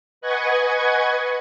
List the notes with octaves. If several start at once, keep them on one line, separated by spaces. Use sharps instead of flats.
B4 D#5 F#5 G#5 C#6 G#6